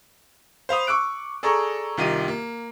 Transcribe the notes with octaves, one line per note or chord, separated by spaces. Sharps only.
C5 F5 B5 D#6
C#6 D6 E6 F#6 D7
G#4 A4 D5 A#5 C#6
C2 D#3 F4 G4 D#5 D#7
A#3